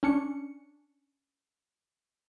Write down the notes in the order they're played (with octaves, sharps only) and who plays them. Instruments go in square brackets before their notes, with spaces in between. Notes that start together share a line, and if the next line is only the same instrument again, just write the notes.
[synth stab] C#4 D4 C#7